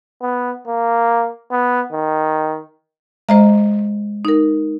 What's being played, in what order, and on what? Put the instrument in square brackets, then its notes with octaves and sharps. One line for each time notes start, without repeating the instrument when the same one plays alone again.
[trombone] B3
A#3
B3
D#3
[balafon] G#3 [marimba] C5 D#5 A#5
[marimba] D#4 A#4